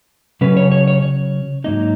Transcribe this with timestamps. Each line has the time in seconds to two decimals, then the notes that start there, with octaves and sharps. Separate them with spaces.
0.41 C#3 F#3 C#4 B4
0.57 C#5
0.72 C#5
0.88 C#5
1.02 C#5
1.64 G#2 F#3 A#3 D#4 D#5